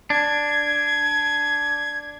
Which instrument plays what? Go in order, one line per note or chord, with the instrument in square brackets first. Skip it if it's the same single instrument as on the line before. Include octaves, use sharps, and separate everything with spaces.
[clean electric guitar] D4 [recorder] G#6